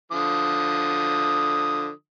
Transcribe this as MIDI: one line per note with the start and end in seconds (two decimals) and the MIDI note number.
0.12 1.91 50
0.12 1.91 53
0.12 1.91 87